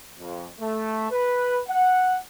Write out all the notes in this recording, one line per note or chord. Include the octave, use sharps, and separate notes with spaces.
F2
A3
B4
F#5